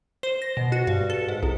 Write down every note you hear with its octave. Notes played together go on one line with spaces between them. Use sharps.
C5
A#6
B2
F#4
G2
A4
G#2
C2